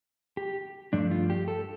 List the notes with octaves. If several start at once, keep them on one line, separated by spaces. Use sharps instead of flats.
G4
G2 F3 A3 D4
F4
G4
A4